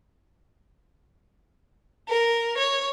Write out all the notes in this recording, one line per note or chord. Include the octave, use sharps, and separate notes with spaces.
A#4
C#5